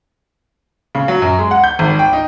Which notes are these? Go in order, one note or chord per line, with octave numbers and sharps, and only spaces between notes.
C#3
F#3
F#2
G#3
F#5
G6
G#1
G5
D#4